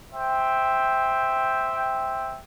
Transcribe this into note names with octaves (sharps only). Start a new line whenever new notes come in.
C5 E5 G5